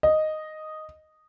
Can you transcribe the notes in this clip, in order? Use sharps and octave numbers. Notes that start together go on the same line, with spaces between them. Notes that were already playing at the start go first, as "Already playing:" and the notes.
D#5